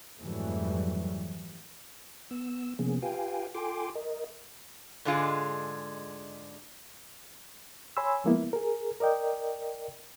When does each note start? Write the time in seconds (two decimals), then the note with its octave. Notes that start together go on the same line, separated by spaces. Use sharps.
0.19 F2 G#2 E3 F#3 G3 A3
2.31 B3 E6
2.79 C3 F3 A#3 B3 C#4 G#4
3.02 F4 G4 B4 F5 G5 G#5
3.54 F4 A4 G5 G#5 C6 D6
3.95 A#4 D#5
5.05 G#2 D3 G#3 F4
7.97 C#5 G#5 B5 C6 E6
8.24 F3 G#3 A#3 B3 E4
8.53 G#4 A#4
9.00 A#4 D5 D#5 G5